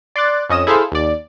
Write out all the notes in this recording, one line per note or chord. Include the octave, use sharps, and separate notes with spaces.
D5 C6 D6 F#6 A6
F2 C#4 D#5 D#6 E7
E4 G#4 A4 C5 E5 F5
D#2 D5